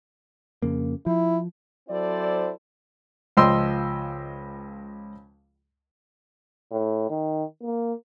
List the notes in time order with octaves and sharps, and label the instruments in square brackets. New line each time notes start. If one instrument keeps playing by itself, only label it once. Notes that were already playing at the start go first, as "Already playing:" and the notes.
[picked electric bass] F2 C#3 A#3
[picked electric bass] F3 [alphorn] E4
[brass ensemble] F#3 C4 E4 A4 C5 D5
[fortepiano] C#2 F3 D#5 G5 C6 E6
[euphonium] A2
D#3
A#3